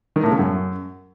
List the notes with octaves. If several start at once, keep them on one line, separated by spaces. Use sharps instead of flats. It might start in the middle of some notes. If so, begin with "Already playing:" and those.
D#3
A2
C#3
F#2